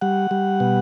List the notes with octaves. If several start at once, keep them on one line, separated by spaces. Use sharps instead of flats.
G3 F#5
G3
B2